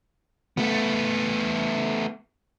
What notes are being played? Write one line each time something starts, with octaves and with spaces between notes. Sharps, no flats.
A3 B3